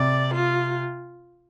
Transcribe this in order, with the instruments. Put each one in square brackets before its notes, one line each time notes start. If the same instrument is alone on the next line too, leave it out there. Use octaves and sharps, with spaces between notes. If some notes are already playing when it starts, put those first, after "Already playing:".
Already playing: [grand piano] C3 [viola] D5
[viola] F4